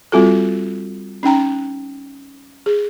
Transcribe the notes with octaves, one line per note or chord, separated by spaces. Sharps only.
G3 C4 F4 F#4 A4
C#4 D#4 G5 A#5
G#4